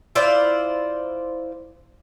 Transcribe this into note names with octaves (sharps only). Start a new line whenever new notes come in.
E4 F4 C5 D5